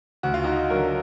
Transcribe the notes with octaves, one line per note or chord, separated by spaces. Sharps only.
D2 F#4
F4
D#4 F#4
D3 F#3 F#4 A#4